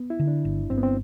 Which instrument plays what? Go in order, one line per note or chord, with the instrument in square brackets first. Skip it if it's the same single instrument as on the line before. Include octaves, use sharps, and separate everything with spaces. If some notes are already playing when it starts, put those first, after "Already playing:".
Already playing: [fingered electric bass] B3
[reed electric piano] E4
[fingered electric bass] D3
[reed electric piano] D4
[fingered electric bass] G1
[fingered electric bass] G1 [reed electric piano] C4
[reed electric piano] B3
C4